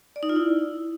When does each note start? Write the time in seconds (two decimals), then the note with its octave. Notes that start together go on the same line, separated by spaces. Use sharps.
0.16 D5
0.23 D#4
0.29 F4
0.36 E4